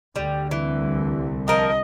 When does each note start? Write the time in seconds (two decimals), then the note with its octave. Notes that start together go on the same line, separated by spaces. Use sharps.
0.16 D2 D3 G3
0.51 C2 E3
1.48 F3 A#4 D#5 A5